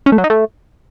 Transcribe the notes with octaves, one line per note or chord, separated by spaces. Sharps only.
C#4
A3
F#3
D#4
A3